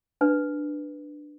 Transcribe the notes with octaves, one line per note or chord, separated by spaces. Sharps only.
D4 B4